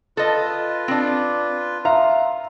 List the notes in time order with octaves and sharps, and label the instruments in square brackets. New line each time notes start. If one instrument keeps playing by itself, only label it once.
[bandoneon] F4 B4 [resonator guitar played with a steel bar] A4 D#5
[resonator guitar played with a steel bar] C4 D4
[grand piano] E5 F5 C6 [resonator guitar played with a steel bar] A#5